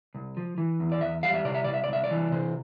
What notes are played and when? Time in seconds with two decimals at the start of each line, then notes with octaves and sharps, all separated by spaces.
0.15 C2
0.37 F3
0.58 E3
0.80 E2
0.92 D5
1.01 E2 E5
1.23 G3 F5
1.34 E5
1.45 C3 D5
1.55 E5
1.64 C2 D5
1.74 E5
1.84 D5
1.88 C2 E5
2.04 D5
2.11 E3
2.32 C3 C5